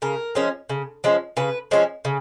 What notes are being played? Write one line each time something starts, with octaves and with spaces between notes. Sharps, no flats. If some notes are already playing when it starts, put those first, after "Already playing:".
C#3 A#4
F3 G#3 C#4
C#3
F3 G#3 C#4
C#3 B4
F3 G#3 C#4
C#3